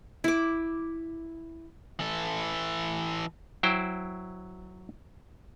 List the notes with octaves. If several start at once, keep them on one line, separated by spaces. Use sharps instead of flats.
E4 D6
E3 A4
F#3 E4 C5 G5